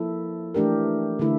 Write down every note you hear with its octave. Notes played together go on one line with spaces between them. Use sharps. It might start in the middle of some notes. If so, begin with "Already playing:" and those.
Already playing: F3 A#3 E4 A4
E3 A3 D4 G4 A#4
D3 A3 E4